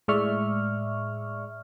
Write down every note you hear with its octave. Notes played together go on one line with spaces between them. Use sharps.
A2 G#3 D5 E5 C#6 F6